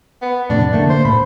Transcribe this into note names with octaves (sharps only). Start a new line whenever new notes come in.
B3
F2 A2 C3 D4
D3 A3 A#3
C5
C#2 A2 B5